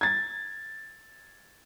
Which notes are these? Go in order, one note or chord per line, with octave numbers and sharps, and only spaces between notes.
G#6 A6